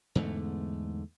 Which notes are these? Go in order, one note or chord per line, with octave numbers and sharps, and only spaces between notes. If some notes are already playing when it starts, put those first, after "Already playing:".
E2 G#2 D3 A3